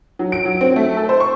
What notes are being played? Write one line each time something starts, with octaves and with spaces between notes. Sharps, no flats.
F#3
D7
F#3
C4
A3
A4
C5
C#6